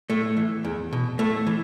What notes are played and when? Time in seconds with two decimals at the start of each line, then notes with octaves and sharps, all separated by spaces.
0.10 A2 A3
0.37 E3
0.65 E2
0.93 B2
1.19 A2 A3
1.47 E3